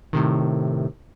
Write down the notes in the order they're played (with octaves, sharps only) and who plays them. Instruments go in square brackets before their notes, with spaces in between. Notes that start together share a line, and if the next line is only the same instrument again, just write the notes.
[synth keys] A2 C3 D#3